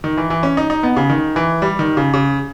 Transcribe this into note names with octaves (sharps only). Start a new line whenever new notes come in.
D#3
E3
E3
C#4
D#4
D#4
B3
C#3
D#3
E3
G3
D#3
C#3
C#3